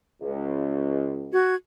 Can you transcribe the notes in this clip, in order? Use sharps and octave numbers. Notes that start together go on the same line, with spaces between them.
C#2
F#4 G#6